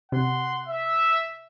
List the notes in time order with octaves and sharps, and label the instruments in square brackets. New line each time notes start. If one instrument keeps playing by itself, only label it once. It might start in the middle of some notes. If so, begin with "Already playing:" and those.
[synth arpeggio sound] C3 [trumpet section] F#5 C6
[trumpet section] E5